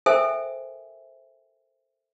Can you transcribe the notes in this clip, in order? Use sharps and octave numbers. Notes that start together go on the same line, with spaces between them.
A4 A#4 C5 E5 G5 G#5